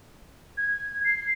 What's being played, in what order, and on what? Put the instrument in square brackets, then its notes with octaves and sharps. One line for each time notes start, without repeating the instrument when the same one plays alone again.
[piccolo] G#6
C7